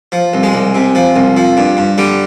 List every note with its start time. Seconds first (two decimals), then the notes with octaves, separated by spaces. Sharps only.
0.12 F3
0.34 C2
0.43 G#3
0.54 C2
0.75 C3
0.95 F3
1.16 C2
1.37 F3
1.57 G2
1.77 G2
1.98 D3 G3